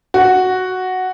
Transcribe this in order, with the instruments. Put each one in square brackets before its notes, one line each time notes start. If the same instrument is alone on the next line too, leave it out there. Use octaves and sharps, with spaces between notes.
[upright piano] F#4